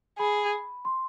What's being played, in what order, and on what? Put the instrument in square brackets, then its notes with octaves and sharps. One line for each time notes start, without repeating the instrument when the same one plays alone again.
[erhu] G#4 [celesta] B5
[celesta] C6